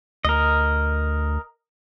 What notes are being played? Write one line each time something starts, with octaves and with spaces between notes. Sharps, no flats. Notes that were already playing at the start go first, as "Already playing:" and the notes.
D2 A#4 D#5